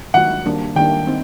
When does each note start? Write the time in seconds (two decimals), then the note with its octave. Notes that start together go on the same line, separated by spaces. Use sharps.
0.14 D#3 F#3 A#3 F#4 F#5
0.46 D#3 G3 A#3 D4
0.76 D#3 G3 A#3 D4 G5
1.07 C4 D#4